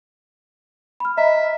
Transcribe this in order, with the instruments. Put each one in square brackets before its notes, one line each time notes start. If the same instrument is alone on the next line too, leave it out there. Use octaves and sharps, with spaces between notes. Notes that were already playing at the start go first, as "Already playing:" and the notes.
[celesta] B5 F6
[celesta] D#5 A#5 [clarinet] E5